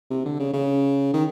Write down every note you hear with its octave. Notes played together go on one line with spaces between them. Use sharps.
C3
D3
C#3
C#3
D#3